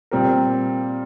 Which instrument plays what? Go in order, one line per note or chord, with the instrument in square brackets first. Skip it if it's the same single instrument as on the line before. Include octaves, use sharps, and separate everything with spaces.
[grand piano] A#2 G3 C4 G4 A#4